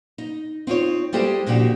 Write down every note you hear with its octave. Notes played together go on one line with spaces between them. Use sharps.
D#4
C4 D#4 F4 C#5
G3 G#3 E4 G4 A4 C5
A#2 C#3 F3 D4 F#4 G4